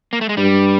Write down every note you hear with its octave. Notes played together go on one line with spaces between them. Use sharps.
A#3
A3
G#3
G2 G3